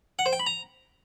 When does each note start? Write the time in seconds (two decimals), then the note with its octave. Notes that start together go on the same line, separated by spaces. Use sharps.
0.19 F#5
0.26 C5
0.33 G5
0.40 B5
0.46 A#5